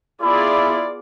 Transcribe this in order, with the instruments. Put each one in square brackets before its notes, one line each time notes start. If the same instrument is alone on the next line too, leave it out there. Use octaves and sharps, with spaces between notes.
[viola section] B3 F4 G#4 D5 [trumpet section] E4